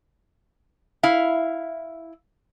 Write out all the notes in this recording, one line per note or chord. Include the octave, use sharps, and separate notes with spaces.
E4 F5